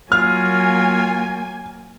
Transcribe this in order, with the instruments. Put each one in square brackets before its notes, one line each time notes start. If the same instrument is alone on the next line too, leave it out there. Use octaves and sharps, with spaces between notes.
[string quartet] F#3 [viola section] A#3 G#5 [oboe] F4 [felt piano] F6